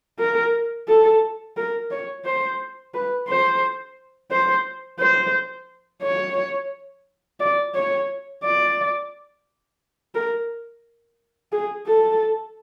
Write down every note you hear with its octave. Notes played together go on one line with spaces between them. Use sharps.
A#4
A4
A#4
C#5
C5
B4
C5
C5
C5
C#5
D5
C#5
D5
A#4
G#4
A4